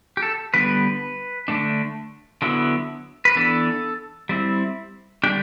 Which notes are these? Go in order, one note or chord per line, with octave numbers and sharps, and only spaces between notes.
G4
A4
D3 G3 B3 B4
D3 A3 D4
D3 F#3 B3 E4
B4
E3 B3 D4 A4
G3 C4 E4
D3 G3 D4 G4